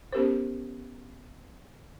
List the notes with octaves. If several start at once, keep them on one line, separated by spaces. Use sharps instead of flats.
B3 C#4 G4 A#4 C5